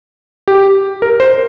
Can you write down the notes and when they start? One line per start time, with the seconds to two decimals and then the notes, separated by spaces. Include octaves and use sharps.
0.48 G4
1.02 A#4
1.20 C5